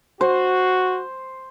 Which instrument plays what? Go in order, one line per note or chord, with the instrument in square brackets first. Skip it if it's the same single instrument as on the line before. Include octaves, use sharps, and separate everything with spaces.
[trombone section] F#4 [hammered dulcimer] C5